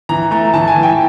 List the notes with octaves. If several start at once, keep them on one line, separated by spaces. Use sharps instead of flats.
E3 A#5
A3 A#5
E3 A5
G#5
E3
G5